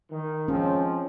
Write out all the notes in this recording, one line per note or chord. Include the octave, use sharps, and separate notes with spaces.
D#3
F3 G#3 C4 C#4